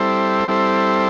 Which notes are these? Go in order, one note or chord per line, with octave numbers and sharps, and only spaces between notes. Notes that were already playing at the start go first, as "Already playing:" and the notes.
Already playing: G3 C4 E4 A4 C5
G3 C4 E4 A4 C5